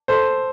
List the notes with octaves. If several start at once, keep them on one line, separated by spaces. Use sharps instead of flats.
A4 C5